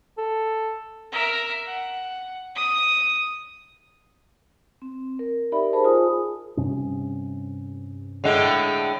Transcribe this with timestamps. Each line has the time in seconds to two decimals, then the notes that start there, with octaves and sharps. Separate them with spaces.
0.18 A4
1.12 A#4 E5
1.66 F#5
2.55 D#6
4.82 C4
5.19 A#4
5.52 D#4 G4 A#4 D5 E5 B5
5.73 G#4 A#4 C5 A5
5.84 F4 G#4 G#5 D#6
6.57 G2 C3 C#4
8.24 A2 D3 G#3